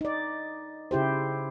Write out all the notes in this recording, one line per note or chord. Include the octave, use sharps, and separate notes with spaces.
D#4 D5
C#3 E4 G4 C5